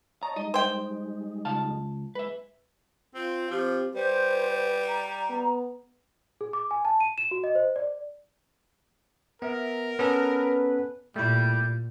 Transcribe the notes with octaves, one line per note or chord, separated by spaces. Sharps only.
C#5 D#5 A5 A#5
G3 G#3 D#4 D#5
C5 G5
C#2 F5 A5
G#3 B4 E5
C4 F4
F3 C4 G4
G3 B4 C5
A#5
B3
G#4
D6
G#5
A5
D#7
E7
F#4
D#5
C5
D5
B3 A#4 E5
B3 C#4 A4 B4
A#2 G3 A3 E4 G6